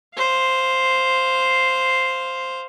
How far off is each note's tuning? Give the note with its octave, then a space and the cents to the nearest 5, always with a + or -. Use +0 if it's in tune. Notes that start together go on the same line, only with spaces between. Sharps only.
C5 +0 F5 +0